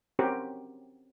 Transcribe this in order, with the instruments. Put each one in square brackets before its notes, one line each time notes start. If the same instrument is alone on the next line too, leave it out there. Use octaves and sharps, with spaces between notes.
[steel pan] C4 C#4 F#4 G4 A#4 C5